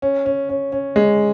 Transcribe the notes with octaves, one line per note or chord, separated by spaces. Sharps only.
C#4
C#4
C#4
C#4
G#3